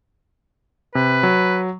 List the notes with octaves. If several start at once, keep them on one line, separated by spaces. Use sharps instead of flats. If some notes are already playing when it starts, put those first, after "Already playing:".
C3 B4
F#3